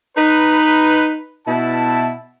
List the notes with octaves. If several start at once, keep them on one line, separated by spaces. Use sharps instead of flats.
D#4 B4
B2 E4 A5